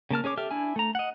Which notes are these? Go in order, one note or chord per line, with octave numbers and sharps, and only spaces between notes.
C#3 A#3 A5 F6
C#4 G#4 C#5 D6
G4 A4 E5 F6
D4 E4 G#5
A3 A#5
D#5 F#5